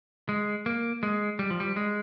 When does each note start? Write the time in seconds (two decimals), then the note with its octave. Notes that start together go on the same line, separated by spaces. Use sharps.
0.29 G#3
0.66 A#3
1.03 G#3
1.39 G3
1.51 F3
1.60 G3
1.76 G#3